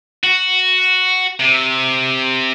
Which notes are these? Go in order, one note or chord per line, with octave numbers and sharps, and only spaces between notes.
F#4
C3